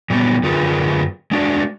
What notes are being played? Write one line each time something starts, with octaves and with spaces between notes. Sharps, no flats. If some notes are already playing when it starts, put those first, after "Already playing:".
A#2 F#3 G3 B3
F#2 D3 F4 G#4 A#4 B4
G#3 D4 F#4 D5